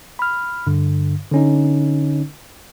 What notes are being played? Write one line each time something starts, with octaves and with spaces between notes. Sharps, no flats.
B5 F6
G2 D3
D3 C#4 D#4